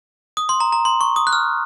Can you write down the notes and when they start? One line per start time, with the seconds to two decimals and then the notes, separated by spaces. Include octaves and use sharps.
0.37 D#6
0.49 C6
0.60 A#5
0.73 A#5
0.85 C6
1.01 C#6
1.16 D#6
1.27 F#6
1.33 F6